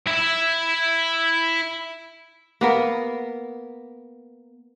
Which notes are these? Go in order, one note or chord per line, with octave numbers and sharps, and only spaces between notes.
E4 E5
A#3 B3 A#4